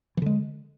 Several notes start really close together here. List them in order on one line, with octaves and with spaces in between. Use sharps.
E3 D3 G#3